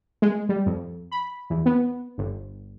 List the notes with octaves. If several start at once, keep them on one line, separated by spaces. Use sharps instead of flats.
G#3
G3
F2
B5
E2
B3
G1